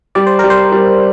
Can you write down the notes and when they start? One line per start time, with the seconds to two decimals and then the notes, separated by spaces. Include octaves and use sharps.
0.15 G3 D5
0.27 C5
0.39 G3 A#4
0.50 C5
0.72 G3